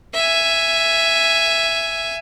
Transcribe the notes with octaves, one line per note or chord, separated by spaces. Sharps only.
E5 G#5